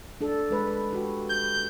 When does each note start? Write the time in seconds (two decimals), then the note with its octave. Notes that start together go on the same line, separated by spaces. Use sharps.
0.21 D4 A4
0.50 G#3 B4
0.93 F#4 G4
1.30 G6